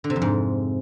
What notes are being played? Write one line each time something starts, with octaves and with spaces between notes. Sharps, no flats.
D3
C3
F2
G#2